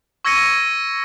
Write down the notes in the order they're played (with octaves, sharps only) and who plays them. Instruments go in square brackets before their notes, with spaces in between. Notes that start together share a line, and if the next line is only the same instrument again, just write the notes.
[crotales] C#6 E6 G#6 A#6 C#7 D#7